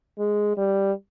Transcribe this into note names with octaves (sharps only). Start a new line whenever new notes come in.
G#3
G3